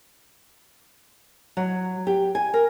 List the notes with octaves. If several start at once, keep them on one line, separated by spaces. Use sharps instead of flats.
F#3
G4
G#5
A#4